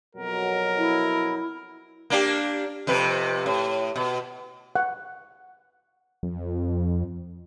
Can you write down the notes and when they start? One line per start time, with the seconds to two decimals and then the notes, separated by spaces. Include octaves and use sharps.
0.15 F2 B2 F#3 A#4
0.78 E4
2.10 A#3 D4 G4
2.87 F2 C3 B4
3.46 A2
3.96 B2
4.76 F#5
6.23 F2